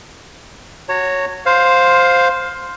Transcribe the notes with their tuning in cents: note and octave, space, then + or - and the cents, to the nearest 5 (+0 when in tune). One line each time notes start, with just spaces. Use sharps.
F#4 +0 C#5 +0 A#5 -45
C5 +0 F5 +15